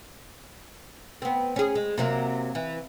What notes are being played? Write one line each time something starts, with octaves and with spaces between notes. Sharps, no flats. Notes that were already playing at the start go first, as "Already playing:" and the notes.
B3 C4
C#4 G#4
G#3
C3 F#3 A#3
E3